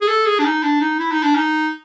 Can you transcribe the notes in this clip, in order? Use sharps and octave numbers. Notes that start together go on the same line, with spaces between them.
G#4
A4
G#4
D4
D#4
D4
D#4
E4
D#4
D4
D#4